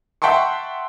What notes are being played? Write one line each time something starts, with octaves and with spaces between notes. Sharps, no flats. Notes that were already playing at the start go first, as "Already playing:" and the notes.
E5 F#5 G5 A5 C6 C#6